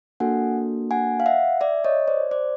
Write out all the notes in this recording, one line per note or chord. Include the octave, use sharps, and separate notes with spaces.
A#3 D4 F#4 A4 F#5 G#5
F#5 G#5
F5
E5 F#5
D5 E5
C#5 D#5
C5 D5
C5 D5